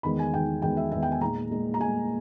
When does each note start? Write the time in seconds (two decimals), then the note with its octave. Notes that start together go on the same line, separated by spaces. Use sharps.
0.03 E2 D#3 G#3 B5
0.19 G#5
0.33 E2 D#3 G#3 G5
0.62 E2 D#3 G#3 G5
0.77 E5
0.92 E2 D#3 G#3 E5
1.02 G5
1.12 G#5
1.21 A#2 G#3 A#5
1.51 A#2 G#3
1.74 A#5
1.80 A#2 G#3 G#5